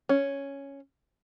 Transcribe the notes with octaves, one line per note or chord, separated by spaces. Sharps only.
C#4